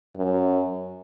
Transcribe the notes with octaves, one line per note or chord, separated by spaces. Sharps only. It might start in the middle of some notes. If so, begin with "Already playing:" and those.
F#2